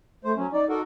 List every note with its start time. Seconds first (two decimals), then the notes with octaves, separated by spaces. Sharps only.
0.25 A3 C5
0.37 F#3 C#4
0.53 D#4 D5
0.69 D#4 F#4 A4 A#4